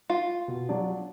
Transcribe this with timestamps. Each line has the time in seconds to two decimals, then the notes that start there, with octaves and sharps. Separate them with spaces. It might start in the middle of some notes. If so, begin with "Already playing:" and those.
0.10 F4
0.48 B2
0.69 F#3 D4